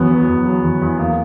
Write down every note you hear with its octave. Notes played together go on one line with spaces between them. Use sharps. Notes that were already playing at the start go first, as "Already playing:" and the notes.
Already playing: E2 F#3 B3
F#3
E2
F#3
E2
E2
A#3